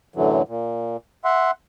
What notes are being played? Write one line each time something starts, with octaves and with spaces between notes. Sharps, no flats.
F#2 A2 D3 E3 F#3
A#2
E5 F#5 C6